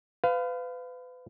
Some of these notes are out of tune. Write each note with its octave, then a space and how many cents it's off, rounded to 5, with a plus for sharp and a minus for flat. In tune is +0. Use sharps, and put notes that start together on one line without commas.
B4 +35 F5 +0